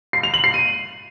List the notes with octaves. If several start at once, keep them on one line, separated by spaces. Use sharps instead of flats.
C7
F7
F#7
C7
D#7